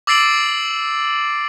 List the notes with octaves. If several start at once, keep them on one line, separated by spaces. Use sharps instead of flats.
D6 E6 A6 C7 D7 F#7